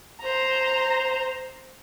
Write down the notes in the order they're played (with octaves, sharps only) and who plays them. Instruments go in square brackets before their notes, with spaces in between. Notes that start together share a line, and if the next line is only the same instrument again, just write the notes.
[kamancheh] C5 A#5